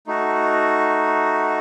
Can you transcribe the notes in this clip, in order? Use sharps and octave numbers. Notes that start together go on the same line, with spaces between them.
A3 D#4 F#4